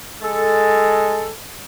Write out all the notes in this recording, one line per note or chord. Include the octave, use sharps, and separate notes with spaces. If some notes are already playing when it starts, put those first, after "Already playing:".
G#3 A4